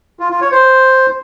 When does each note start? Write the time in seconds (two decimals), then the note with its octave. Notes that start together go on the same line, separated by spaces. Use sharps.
0.19 F4
0.30 F4
0.41 C#5
0.52 C5